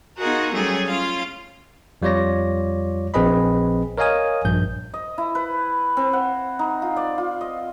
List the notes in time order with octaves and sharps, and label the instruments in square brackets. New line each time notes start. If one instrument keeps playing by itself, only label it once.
[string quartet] B3 D#4 F4 F#4 G#4 A#4
F#3 G3 A3 C#4 G#4
C#4 F4 F5
[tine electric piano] F2 G3 F4 C#5 D5 A#6
A#1 C4 G#4 B4 D#5 B5
A#4 C#5 D#5 F5 G#5 D#6
A#1 G2 G6
[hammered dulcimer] D#5
E4
B4
C4
F#5
D#4
F4
D5
F4
D#5